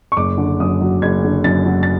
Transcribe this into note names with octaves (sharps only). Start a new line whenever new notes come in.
C#6
F#1 D6
D3
F#2 D#6
F#3
F#1 G#6
D3
F#2 A6
F#3
A6